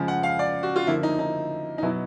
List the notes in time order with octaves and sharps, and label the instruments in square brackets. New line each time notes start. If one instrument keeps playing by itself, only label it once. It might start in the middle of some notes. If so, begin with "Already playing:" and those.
Already playing: [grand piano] C#3 F3 G#3
F#5
F5
D5
F#4
F4
D3 F3 A#3 E4
D#4
D#4
D#4
B2 F#3 B3 E4